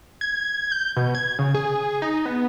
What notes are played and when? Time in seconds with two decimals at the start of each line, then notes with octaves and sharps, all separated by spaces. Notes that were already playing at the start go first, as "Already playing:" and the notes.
0.21 G#6
0.72 G6
0.97 B2
1.15 G#6
1.39 C#3
1.54 G#4
2.02 D#4
2.25 B3